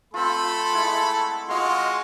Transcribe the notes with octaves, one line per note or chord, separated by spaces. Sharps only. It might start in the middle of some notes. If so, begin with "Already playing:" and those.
A3 C4 F4 A4 B5
G#3 E4 F#5
G#3 F4 F#4 D#5 C6